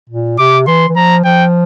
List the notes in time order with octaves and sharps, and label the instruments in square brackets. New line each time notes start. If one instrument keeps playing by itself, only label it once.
[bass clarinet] A#2
[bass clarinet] C3 [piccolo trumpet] D6
[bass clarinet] E3 [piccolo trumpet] C6
[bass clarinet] E3
[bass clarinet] F3 [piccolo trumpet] A#5
[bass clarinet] F3 [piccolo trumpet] G5